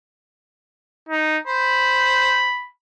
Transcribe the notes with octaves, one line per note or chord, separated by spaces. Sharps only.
D#4
C5 B5